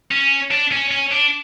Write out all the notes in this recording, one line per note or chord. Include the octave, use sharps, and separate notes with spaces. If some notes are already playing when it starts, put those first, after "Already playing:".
C#4
D4
C#4
C#4
D4